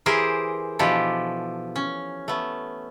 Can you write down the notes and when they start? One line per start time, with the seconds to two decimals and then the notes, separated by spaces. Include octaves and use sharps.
0.06 E3 G4 G#4 A#4 C5
0.79 B2 E3 F3 D4 G4 A4
1.76 C#4
2.28 A3 B3